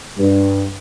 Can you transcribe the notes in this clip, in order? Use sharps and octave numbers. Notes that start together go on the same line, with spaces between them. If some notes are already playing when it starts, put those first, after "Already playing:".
G2